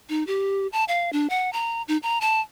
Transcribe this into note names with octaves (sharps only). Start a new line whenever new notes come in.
D#4
G4
A5
F5
D4
F#5
A#5
D#4
A#5
A5